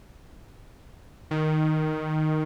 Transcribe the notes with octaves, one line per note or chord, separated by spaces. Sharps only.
D#3